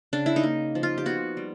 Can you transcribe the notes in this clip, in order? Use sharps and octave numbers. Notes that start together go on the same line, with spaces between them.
C#3 D4
E4
D#4
A#3
F3
F4
G4
B3 F#4
G3